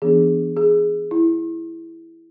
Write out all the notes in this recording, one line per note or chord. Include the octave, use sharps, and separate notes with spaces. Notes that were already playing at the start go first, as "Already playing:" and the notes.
E3 B3 D4 G#4
G#4
E4